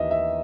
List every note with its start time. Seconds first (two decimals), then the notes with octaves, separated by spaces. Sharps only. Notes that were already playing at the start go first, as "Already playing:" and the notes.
Already playing: D#2 E3 D#5 E5
0.11 E5